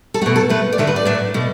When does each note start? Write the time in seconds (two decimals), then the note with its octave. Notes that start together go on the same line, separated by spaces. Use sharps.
0.14 A4
0.22 A3 F#4
0.26 B2
0.36 A4
0.49 A2 F#3 A3 B4
0.73 D5
0.78 D3 F#3 A3 E5
0.87 B4
0.96 D5
1.05 A2 F#3 A3
1.34 B2 A3